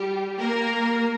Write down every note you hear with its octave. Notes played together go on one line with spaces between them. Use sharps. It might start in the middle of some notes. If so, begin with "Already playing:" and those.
Already playing: G3 G4
A#3 A#4